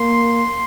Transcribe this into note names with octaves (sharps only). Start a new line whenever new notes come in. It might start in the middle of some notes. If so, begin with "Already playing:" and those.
Already playing: A#3 C6